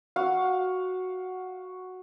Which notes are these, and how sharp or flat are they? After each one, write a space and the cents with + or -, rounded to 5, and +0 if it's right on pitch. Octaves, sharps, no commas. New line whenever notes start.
F#4 +0 F5 +15